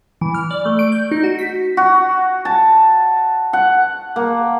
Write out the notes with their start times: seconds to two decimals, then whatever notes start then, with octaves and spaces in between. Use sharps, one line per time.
0.21 E3
0.34 F6
0.51 D5
0.65 A3
0.79 D7
0.92 G6
1.11 D#4
1.23 F#4
1.39 B6
1.77 F#4
2.45 A5
3.53 F#5
4.16 A#3